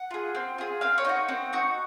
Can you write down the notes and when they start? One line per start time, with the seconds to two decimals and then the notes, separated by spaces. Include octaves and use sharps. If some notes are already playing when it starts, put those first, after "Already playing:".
Already playing: F#5
0.11 F4 G#4
0.35 C4
0.58 F4 G#4
0.81 C4 F5
0.98 C#5
1.04 D#4 F#4 D#5
1.29 C4 F#5
1.53 D#4 F#4